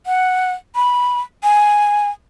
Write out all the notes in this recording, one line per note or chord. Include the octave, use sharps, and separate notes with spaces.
F#5
B5
G#5